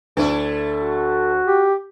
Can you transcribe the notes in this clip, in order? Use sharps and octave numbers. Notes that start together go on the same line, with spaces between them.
D2 A3 D4 E4 A4
F#4
G4